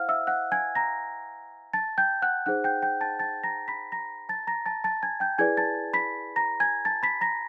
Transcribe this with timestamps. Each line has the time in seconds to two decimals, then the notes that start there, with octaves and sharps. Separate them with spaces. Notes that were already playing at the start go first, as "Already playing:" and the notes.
Already playing: E4 C5 F5 F#5 F6
0.09 E5 E6
0.27 F#5 F#6
0.52 G#5 G#6
0.75 A#5 A#6
1.73 A5 A6
1.98 G5 G6
2.22 F#5 F#6
2.46 D#4 G#4 C5 F#5 F#6
2.64 G5 G6
2.82 G5 G6
3.01 A5 A6
3.19 A5 A6
3.44 A#5 A#6
3.68 B5 B6
3.92 A#5 A#6
4.29 A5 A6
4.47 A#5 A#6
4.66 A5 A6
4.84 A5 A6
5.03 G#5 G#6
5.20 G5 G6
5.38 E4 G#4 B4 D5 G#5 G#6
5.57 A5 A6
5.93 B5 B6
6.36 A#5 A#6
6.60 G#5 G#6
6.85 A5 A6
7.03 B5 B6
7.21 A#5 A#6